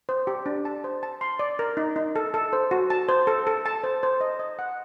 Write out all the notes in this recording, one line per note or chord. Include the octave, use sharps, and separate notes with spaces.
C5
G4
D4
A5
C5
A5
C6
D5
A#4
D#4
D#4
A4
A4
C5
F#4
A5
C5
A4
A4
A5
C5
C5
D#5
D#5
F#5